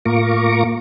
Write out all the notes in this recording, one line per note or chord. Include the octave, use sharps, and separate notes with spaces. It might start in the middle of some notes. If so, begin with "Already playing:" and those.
A2 A#3 F4 A#5 C#6 D6